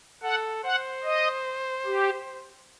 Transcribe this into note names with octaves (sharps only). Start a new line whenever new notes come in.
A4 F#5
C5 F#5
D#5
G4